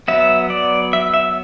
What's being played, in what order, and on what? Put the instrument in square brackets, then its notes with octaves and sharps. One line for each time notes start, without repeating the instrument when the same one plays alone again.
[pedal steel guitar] F#3 B3 E5
D5
E5
E5